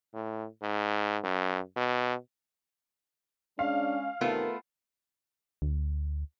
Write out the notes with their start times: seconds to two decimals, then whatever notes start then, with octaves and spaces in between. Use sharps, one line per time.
0.14 A2
0.62 G#2
1.24 F#2
1.76 B2
3.59 G#3 C#4 D4 F5
4.21 E2 C3 D#3 A3 B3 F4 A#4
5.62 D2